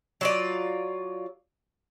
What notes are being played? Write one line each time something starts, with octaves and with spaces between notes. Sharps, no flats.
F#3 F4 D5